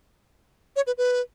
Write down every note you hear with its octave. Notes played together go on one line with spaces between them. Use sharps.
C#5
B4
B4